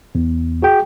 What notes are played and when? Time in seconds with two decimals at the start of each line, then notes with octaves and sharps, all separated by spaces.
0.15 E2
0.62 F#4 G#4 G5